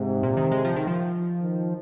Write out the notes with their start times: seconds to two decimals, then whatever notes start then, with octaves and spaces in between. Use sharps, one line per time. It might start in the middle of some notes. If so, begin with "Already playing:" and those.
Already playing: G#2 C3
0.23 A#2
0.37 D#3
0.51 G#3
0.65 F3
0.76 D#3
0.87 F3
1.41 D#3